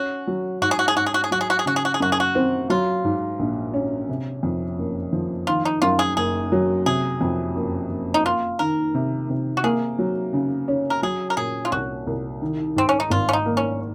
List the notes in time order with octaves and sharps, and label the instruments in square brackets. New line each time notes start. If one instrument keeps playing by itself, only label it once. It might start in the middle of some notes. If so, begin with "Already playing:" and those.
Already playing: [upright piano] C#4 [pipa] F#4
[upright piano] F#3
[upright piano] G#2 [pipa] F#4
[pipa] G#4
F#4
G#4
[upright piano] G#2 [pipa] F#4
[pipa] G#4
F#4
G#4
[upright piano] F#3 [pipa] F#4
[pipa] G#4
F#4
G#4
[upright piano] C#3 [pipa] F#4
[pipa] G#4
F#4
G#4
[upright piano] F#2 [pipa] F#4
[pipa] G#4
F#4
[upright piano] C4
[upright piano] F#3 [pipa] F4
[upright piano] G#2
A#1
C#4
C3
F2
F#1
F3
[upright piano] D#3 [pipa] F4
[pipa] D#4
[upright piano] F#2 [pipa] F4
[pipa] G#4
[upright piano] F#1 [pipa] G#4
[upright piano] F#3
[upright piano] C3 [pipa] G#4
[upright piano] F2
F#1
F#1
[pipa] D#4
[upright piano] A#3 [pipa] F4
[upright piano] D#3 [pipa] A#4
[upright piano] C3
C3
[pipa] F#4
[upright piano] A#3 [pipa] G#4
[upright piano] F#3
C#3
C#4
[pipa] A#4
[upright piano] F#3 [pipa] G#4
[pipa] A#4
[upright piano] A#2 [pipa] G#4
[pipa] F4
[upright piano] C2 [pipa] F#4
[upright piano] C2
D#3
[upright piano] G#2 [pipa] C4
[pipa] C#4
D#4
[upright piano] G#1 [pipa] F4
[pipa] C#4
D#4
[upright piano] A#3
[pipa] C#4